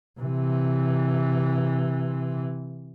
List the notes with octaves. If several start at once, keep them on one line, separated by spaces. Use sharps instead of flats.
C3 E3